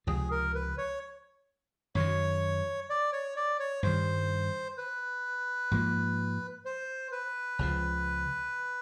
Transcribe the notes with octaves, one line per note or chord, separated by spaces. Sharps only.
C#2 C3 F3 G#4
A#4
B4
C#5
F#2 D#3 F#3 C#5
D5
C#5
D5
C#5
G2 D#3 G3 C5
B4
G#2 F3 A#3
C5
B4
C#2 C#3 F3